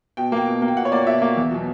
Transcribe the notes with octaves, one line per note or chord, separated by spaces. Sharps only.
B2 G5
A#3 G5
B2
A#3
G5
B2 F#5
C#5
A#3 D5
B2 E5
A#3
E2
B2 F#3